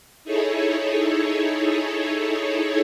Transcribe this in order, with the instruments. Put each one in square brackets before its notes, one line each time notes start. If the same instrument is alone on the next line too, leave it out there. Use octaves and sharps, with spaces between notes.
[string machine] D#4 E4 G#4 A4 C#5